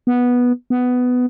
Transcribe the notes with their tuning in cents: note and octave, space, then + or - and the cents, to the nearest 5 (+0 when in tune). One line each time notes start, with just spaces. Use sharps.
B3 -10
B3 +10